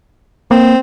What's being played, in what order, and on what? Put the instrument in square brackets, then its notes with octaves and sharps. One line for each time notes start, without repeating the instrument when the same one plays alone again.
[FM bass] A#3 [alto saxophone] C4